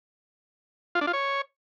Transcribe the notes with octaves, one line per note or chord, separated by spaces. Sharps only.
F4
D4
F4
C#5